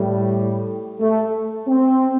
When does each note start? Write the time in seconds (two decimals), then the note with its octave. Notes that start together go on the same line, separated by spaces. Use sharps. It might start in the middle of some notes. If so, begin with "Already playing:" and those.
Already playing: A2 G3
1.01 A3
1.68 C4